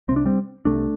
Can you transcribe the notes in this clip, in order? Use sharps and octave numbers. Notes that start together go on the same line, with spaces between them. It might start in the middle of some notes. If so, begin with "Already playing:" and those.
C2 C3 C4 D4
G3 C4
C2 C3 A3 D4